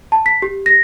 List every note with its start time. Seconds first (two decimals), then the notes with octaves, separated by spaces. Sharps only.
0.12 A5
0.26 B6
0.42 G4
0.66 A#6